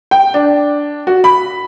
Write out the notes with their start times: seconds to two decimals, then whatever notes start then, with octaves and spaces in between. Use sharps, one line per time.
0.11 G5
0.34 D4
1.07 F#4
1.24 B5